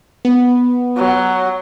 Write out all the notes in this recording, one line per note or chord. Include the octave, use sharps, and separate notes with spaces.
B3
F#3